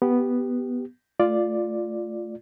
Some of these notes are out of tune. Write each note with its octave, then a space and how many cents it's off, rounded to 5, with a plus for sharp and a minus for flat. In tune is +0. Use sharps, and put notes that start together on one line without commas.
B3 +0 G4 +0
A3 +0 F4 +0 D5 +5